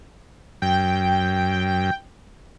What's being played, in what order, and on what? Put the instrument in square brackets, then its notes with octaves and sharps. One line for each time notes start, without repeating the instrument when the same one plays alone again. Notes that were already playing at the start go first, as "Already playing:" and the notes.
[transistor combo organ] F#2 [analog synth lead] G5